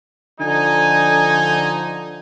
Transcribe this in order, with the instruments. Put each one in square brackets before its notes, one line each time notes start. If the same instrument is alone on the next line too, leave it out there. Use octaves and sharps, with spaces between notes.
[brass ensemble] D3 F3 D#4 [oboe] G#5